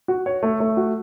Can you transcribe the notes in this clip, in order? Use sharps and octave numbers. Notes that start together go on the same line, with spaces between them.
F#4
C#5
A3
A3
F#4